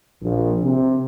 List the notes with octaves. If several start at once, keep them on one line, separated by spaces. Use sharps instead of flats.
A#1
C3